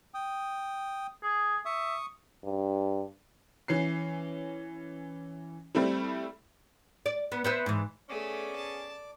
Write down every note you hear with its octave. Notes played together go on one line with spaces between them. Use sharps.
G5 D#6
G#4
E5 C#6 D#6
G2
E3 C#4 C7
G3 A3 C4 E4
D5
B3
B3 C5 E5
G#2 E3
A3 B3 C#4 G#4 D5 D6
A5